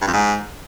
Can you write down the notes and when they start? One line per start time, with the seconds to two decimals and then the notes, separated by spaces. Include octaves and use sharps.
0.01 G2
0.07 F2
0.13 G#2